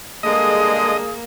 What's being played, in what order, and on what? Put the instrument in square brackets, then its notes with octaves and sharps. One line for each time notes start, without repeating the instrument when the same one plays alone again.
[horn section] D3 G3 G#3 [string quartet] A#3 [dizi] G#4 [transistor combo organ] D#5